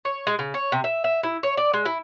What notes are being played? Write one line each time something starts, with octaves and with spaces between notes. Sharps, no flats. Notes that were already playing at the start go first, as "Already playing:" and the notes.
C#5
G#3
C#3
C#5
C3
E5
E5
E4
C#5
D5
G#3
E4